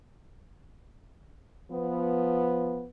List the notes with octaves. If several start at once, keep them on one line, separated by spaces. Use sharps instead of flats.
F3 B3